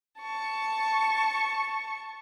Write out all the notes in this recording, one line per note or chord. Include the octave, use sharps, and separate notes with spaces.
A5 C#6